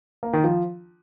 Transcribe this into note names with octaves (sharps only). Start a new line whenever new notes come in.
A#3
D#3
F3